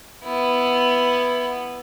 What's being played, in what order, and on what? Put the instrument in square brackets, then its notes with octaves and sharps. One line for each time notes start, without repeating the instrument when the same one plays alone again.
[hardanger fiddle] B3 E4